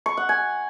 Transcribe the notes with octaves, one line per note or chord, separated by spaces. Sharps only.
C#6
F#5
G#5